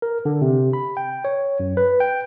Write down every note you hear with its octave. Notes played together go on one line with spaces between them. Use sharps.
A#4
D3
C3
B5
G5
C#5
F#2
B4
G5